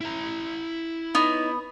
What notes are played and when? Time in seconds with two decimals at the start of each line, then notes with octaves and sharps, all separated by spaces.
0.01 E4 A#5
1.15 B3 D#4 C#5